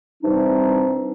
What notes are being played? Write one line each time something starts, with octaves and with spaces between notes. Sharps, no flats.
C3 E3 G3 C4 D4 D#4